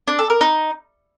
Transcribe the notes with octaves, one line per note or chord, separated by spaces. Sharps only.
D4
A4
A#4
D#4